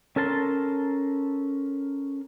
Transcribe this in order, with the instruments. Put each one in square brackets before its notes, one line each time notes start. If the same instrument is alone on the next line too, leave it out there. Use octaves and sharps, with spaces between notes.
[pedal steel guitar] C#4 A4 A#4 A5 C6